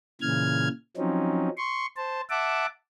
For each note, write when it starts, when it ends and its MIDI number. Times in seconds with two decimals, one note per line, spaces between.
0.21 0.68 46
0.21 0.68 49
0.21 0.68 52
0.21 0.68 89
0.21 0.68 92
0.97 1.49 53
0.97 1.49 54
0.97 1.49 60
0.97 1.49 61
0.97 1.49 63
1.57 1.86 84
1.57 1.86 85
1.96 2.21 72
1.96 2.21 81
2.30 2.66 76
2.30 2.66 78
2.30 2.66 81
2.30 2.66 86